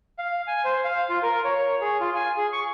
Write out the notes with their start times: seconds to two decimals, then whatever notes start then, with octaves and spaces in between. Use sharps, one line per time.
0.19 F5
0.47 G#5
0.64 C5
0.84 F5
1.10 F4
1.23 A#4
1.45 C#5
1.81 G#4
2.00 F4
2.15 G#5
2.37 G#4
2.53 C#6